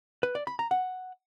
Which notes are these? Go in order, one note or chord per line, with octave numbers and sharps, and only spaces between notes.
B4
D5
B5
A#5
F#5